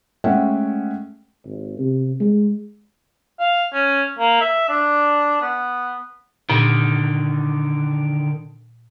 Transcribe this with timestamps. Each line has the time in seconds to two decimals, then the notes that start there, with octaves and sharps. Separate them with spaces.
0.24 G#3 A3 C#4 E5 F#5 G5
1.46 G#1
1.78 C3
2.21 G#3
3.39 F5
3.73 C#4
4.19 A#3
4.41 E5
4.69 D4
5.42 B3
6.50 A#2 D3 D#3